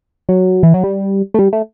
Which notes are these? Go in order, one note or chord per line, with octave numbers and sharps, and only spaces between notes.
F#3
E3
F#3
G3
A3
G3
A3